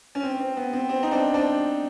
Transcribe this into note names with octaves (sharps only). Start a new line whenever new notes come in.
C#4
C4
C4
B3
C4
C4
D#4
C4 D4
C4 D4